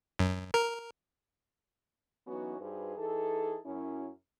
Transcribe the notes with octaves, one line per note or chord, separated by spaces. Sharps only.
F#2
A#4
E3 F#3 B3 C#4 D#4 F#4
G2 D#4 F#4 G#4 B4 C5
E3 D#4 G#4 A4
F#2 C#4 E4